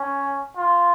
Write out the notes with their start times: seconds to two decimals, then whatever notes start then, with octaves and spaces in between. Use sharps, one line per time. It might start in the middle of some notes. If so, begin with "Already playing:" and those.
Already playing: C#4
0.57 F4